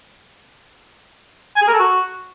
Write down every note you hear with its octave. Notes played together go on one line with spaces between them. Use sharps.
G#5
G#4
A#4
A4
F#4